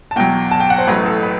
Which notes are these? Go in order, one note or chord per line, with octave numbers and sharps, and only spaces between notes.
A5
E2 B2 F#3 G5
A5
G5
F#5
C5
A1 A2 F#3 B4
A4
B4